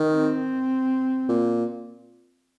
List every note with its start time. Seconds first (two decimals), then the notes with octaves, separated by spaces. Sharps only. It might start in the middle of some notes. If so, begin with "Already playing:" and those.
Already playing: D#3
0.08 C4
1.29 A#2